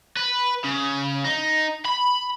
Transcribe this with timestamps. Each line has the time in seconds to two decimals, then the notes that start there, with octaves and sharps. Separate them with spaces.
0.17 B4
0.64 C#3
1.25 D#4
1.86 B5